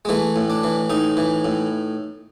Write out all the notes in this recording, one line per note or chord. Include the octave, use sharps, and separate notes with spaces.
G#3
E3 A3
A2
D4
E3
A2 D#4
E3
A2